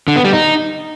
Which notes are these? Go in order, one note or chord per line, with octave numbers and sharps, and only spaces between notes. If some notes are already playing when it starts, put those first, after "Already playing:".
D3
B3
G3
D#4